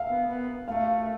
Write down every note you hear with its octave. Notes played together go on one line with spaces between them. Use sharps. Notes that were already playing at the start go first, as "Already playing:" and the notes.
Already playing: E5 F5
B3
B3
A3 F5
E5
F5
F5